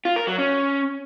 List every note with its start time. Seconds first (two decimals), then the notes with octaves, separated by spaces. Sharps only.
0.05 F4
0.16 A#4
0.27 F#3
0.38 C#4